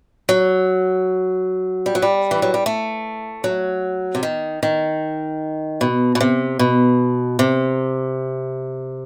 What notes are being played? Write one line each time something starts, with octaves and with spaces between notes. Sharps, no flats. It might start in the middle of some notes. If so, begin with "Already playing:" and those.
F#3
G3
F#3
G3
E3
F#3
G3
A3
F#3
C3
D#3
D#3
B2
B2
C3
B2
C3